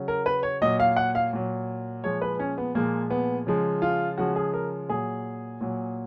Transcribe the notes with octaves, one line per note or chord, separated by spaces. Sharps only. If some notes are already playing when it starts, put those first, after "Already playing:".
Already playing: C#3 F#3
A#4
B4
C#5
A#2 F#3 D#5
F5
F#5
F5
A#2 F#3
A#2 F3 G#3 C#5
B4
C#4
B3
A#2 F3 G#3 A#3
B3
C#3 F3 G#3
F4
C#3 F3 G#3 F#4
G#4
A#4
A#2 F#3 G#4
A#2 F#3